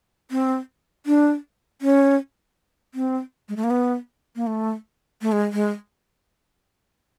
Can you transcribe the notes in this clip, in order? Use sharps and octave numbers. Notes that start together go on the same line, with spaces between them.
C4
D4
C#4
C4
G#3
A3
A#3
B3
A#3
A3
A3
G#3
G#3